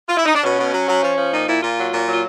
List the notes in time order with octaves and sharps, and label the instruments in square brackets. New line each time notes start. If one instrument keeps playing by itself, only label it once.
[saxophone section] F4
E4
D#4
D4
B2 C#4
B2
F#3
F#3
F3
F3
A#2 D#4
A#2 E4
A#2 F4
F#3
A#2
F#3
F4